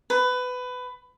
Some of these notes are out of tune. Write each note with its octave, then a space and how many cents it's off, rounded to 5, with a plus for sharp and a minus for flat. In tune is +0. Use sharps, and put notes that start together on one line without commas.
B4 +20